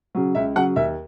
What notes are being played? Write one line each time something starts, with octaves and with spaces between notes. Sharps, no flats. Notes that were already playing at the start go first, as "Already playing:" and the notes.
C#3 F#3
C#2 E5
C#3 F#3 F#5
D#2 E5